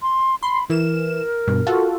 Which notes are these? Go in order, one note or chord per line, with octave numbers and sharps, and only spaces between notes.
C6
B5 C6
E3 A#4 E7
G2 B2
F4 F#4 A4